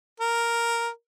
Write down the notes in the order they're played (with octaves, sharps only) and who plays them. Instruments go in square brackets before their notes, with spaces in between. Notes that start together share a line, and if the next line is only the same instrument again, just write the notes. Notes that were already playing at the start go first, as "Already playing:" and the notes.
[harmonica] A#4